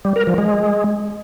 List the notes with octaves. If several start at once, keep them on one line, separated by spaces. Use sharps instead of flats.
G3
A#4
F3
G#3